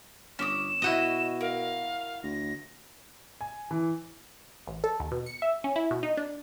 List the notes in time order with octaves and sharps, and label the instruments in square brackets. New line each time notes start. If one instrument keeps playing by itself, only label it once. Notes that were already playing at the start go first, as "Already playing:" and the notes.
[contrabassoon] G1 [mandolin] C#4 D6 D#6 [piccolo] E7
[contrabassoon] B2 [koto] E4 F#4 D#5
[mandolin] A#4 [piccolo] F5
[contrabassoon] D2 [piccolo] A#6
[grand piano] G#5
E3
[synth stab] A1
A4
D#2
B2
C#7
E5
C#4
E4
B2
D#4
D4